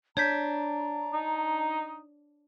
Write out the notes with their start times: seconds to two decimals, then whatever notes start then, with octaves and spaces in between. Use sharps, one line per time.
0.17 D4 C#5 A#5 G6 B6
1.14 D#4